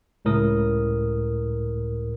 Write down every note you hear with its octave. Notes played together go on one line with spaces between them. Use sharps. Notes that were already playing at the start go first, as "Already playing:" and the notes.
C#2 A2 A#4 D#6